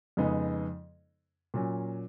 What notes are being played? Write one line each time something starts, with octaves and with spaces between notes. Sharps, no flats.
F2 C#3 G#3 B3 D#4
A#2 F#3 C#4